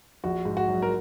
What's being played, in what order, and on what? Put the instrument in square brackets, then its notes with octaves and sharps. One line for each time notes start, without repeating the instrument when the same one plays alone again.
[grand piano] A#1 F#4
G#2
F#4
F#3
A#4